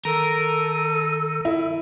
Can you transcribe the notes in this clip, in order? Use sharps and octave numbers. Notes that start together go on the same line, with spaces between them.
D#3 A4 A#4
E4